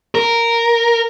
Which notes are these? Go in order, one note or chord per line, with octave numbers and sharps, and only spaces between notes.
A#4